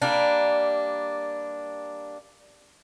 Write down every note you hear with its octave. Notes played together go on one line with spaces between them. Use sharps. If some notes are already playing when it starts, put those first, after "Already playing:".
G3 A#3 D4